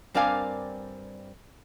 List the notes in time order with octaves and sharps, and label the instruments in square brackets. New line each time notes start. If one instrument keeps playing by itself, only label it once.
[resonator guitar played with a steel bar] G2 C4 A#4 D5 F5 G#5